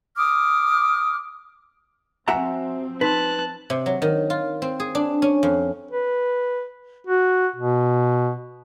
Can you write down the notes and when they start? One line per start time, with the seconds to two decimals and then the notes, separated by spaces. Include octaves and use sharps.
0.16 D6 D#6 F6
2.28 F3 C4 F#4 E5 F#5 G#5 A#5
3.01 D#4 B4 A5 C6 F#6
3.70 C3
3.86 F#3
4.02 D#3
4.30 F4
4.62 C4
4.80 G#4
4.95 D4
5.22 C#4
5.43 F2
5.91 B4
7.07 F#4
7.56 B2